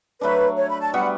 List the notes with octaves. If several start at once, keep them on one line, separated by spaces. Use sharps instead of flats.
F#3 A3 D4 B4
C#5
B5
A5
G3 B3 F#4 F#5